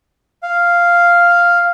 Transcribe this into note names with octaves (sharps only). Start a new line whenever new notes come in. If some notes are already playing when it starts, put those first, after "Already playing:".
F5